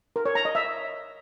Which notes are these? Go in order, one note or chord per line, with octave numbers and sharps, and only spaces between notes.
A#4
C#5
A#5
D#5
E5